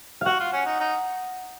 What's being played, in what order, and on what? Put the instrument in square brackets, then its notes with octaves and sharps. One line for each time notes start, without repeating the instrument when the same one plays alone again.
[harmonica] F#4 [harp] F5 F#5
[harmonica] F4
C#4
D#4
D#4